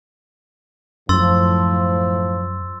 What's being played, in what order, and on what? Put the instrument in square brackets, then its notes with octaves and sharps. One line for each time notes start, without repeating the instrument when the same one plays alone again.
[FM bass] F#2 [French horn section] A2 F3 [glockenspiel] C6 E6 A6